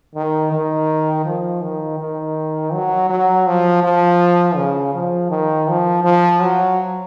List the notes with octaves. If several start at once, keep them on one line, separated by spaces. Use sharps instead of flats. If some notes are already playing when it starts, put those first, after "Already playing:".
D#3
D#3
F3
D#3
D#3
F#3
F#3
F3
F3
C#3
F3
D#3
F3
F3
F#3